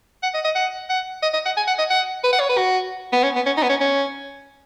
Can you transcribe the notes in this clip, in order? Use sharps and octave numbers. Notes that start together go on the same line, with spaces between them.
F#5
D#5
D#5
F#5
F#5
D#5
D#5
F#5
G#5
F#5
D#5
F#5
B4
F#5
C#5
B4
F#4
B3
C#4
B3
C#4
D#4
B3
C#4
C#4